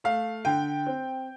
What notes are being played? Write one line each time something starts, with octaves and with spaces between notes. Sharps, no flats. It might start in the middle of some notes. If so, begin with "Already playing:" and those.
A3 F5
D3 G5
C4